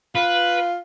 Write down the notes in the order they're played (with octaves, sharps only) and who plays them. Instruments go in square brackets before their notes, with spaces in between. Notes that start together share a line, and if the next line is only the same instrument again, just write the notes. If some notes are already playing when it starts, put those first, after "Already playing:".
[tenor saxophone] F4 [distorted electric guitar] B4